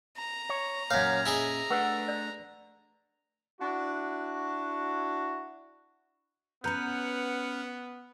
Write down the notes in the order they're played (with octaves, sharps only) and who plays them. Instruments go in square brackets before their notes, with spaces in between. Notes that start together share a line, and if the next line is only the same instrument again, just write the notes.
[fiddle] A#5
[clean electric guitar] C#5
[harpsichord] F#2 F5 [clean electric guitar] A#2 C#4 [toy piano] C#5 E5
[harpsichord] E4 G#4 D#5
[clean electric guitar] A3 D4 [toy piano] B4 F#5
[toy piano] D5
[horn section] D4 E4 F#4
[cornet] B3 [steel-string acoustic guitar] C#4 B4 [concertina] F#5 F6 [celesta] A#5 G6